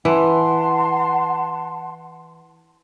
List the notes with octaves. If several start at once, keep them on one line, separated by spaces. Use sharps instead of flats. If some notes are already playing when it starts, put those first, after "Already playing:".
E3 F#5 A5 C6